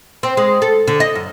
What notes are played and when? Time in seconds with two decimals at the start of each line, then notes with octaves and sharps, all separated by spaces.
0.23 C4
0.37 G#3
0.62 A4
0.88 D3
1.00 D#5
1.15 F#2